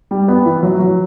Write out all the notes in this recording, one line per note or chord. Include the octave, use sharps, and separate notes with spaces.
G3
B3
E3
F#3
F#3